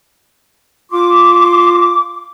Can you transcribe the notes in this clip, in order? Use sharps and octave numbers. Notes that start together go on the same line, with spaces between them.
F4 C6 D6